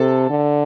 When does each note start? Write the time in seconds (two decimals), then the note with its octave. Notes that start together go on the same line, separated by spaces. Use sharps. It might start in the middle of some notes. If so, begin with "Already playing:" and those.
Already playing: C3 A4
0.30 D3